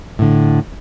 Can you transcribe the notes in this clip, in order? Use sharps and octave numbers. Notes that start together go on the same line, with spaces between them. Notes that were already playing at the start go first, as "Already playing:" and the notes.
A2 D3